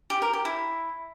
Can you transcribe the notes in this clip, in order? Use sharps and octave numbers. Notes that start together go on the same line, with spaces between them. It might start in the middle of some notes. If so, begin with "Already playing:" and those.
G4
A#4
G4
E4